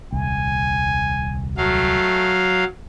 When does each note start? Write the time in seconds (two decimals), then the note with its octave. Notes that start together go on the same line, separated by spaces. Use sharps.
0.13 D#1 C2 G#5
1.57 F#3 A3 F5